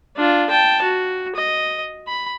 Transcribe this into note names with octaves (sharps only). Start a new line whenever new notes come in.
D4 F4
G5 A5
F#4
D#5
B5